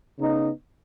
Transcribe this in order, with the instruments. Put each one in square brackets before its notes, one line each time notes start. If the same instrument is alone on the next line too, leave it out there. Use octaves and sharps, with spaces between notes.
[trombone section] C#3 B3 D#4